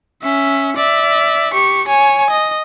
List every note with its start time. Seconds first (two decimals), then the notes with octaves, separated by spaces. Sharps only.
0.23 C#4 E5
0.76 D5 E5
1.54 G4 C#6
1.87 C#5 G#5
2.30 D#5